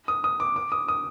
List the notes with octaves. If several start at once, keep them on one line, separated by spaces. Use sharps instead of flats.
D#6
D#6
D6
D6
D#6
D#6